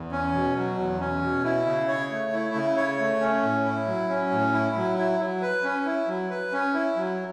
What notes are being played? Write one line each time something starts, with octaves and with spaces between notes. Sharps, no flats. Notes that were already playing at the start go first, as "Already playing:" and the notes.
Already playing: E2
C#4
B2
F#3
E2
C#4
B2
E4
C#3
C#5
A3
E4
C#3
C#5
A3
C#4
A2
E4
F#3
C#4
A2
E4
F#3
E4
F#3
B4
C#4
E4
F#3
B4
C#4
E4
F#3